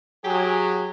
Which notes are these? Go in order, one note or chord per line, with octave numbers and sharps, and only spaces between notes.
F#3 G4 G#4